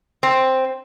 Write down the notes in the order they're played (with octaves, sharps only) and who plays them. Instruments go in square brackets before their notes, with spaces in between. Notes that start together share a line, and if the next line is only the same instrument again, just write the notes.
[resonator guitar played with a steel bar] C4